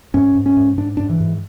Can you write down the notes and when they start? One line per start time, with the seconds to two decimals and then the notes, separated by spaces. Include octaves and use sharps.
0.14 G#2 C#4
0.35 G#2
0.46 C#4
0.57 G#2
0.78 G#2 D4
0.97 G#2 D4
1.10 E3
1.20 G#2